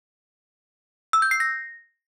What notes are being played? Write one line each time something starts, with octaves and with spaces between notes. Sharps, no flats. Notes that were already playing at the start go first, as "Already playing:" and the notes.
E6
G6
C7
A#6